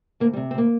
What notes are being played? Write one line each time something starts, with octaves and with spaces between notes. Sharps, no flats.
D2 A#3
G3
C3
C4
D2 A#3